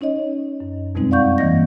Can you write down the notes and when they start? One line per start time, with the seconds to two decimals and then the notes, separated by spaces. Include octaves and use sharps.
0.01 C#4 D#4 C#5 D#5
0.60 F#2
0.95 F2 B2 G3 G#3 C4 D#4
1.11 D5 F5 F#5 C#6 G6
1.38 G2 E3 A#3 D#5 A#6